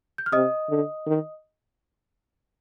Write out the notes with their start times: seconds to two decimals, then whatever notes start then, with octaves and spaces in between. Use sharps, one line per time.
0.18 G6
0.26 F6
0.32 C3 D#5 D#6
0.70 D3
1.06 D#3